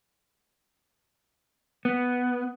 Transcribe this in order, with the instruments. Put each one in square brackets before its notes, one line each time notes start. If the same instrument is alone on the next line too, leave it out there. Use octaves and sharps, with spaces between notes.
[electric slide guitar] B3